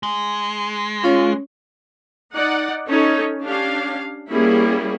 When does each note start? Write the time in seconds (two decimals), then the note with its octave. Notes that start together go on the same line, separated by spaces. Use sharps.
0.03 G#3
1.04 C#4 F4 C#5
2.34 D#4 D5 F#5
2.87 C#4 D#4 A4 C#5
3.42 C#4 D4 G4 F5
4.30 G3 A#3 C#4 E4 G#4